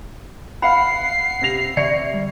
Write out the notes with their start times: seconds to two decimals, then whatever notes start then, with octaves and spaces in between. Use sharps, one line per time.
0.62 F5 F#5 B5 C7
1.41 C3 A#6 F7
1.77 D3 D5 E5 C#6 C#7
2.14 G3